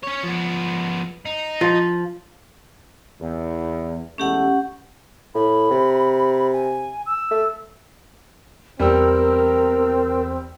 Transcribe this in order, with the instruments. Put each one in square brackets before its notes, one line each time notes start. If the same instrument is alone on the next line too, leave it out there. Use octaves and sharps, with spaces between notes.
[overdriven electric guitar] C#4 C#5
F3 B3
D#4
[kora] F3
[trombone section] E2
[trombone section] E2 G#3 A3 [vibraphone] C#4 G4 F#5
[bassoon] A2 [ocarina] B5
[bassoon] C3
[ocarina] G#5
E6
[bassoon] A3
[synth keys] E2 G5 E6 [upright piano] G3 [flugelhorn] C4 [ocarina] A#4